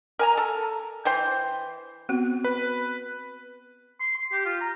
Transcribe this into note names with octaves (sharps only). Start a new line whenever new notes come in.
A#4 G#5 A#5
A4
E3 C5 G5
B3 C4 F#4
B4
C6
C6
G4
F4
A#5